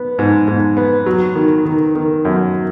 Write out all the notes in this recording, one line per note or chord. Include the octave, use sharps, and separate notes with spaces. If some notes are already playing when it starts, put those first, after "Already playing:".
Already playing: B3
G#2
G#2
B3
F#3
D#3
D#3
D#3
F#2